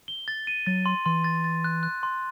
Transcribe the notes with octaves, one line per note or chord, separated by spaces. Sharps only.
G7
A6
D#7
F#3 A6
C6
E3 C6
A6
A6
F#6
F#6
C6